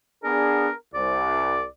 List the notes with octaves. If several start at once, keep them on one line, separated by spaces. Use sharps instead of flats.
B3 D4 G#4 A#4
C2 D5